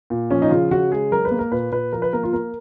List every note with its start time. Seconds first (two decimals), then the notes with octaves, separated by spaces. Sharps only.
0.10 A#2
0.31 F3 C#4
0.42 D#4
0.51 C#3 F4
0.71 C#3 F#4
0.91 G#3 G#4
1.12 F#3 A#4
1.25 B4
1.31 A#3
1.39 A#4
1.51 A#2 B4
1.72 A#2 B4
1.92 F3 A#4
2.02 B4
2.13 A#3 A#4
2.23 F4
2.33 A#3 A#4